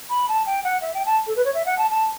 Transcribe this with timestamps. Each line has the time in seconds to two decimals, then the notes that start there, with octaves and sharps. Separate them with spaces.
0.10 B5
0.29 A5
0.46 G5
0.64 F#5
0.82 E5
0.94 G5
1.06 A5
1.27 A4
1.36 B4
1.45 C#5
1.54 E5
1.66 F#5
1.78 A5
1.91 A5